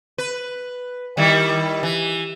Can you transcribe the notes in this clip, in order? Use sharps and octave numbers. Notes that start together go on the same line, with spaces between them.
B4
D#3 G3 E4
E3